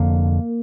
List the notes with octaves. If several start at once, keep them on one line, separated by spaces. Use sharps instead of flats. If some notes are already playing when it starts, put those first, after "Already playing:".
Already playing: F1 F2 D3 A#3